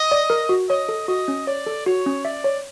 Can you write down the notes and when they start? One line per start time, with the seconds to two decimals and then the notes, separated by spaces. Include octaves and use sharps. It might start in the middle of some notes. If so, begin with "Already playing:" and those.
Already playing: D#5
0.12 D5
0.30 A#4
0.49 F#4
0.70 C#5 D#5
0.89 A4
1.08 F#4 D#5
1.28 C#4
1.47 C#5 D5
1.66 A4
1.86 F#4 C#5
2.06 C#4
2.25 D5 E5
2.44 C#5